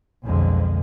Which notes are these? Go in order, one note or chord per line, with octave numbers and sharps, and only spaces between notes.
B1 F2 D3 G#3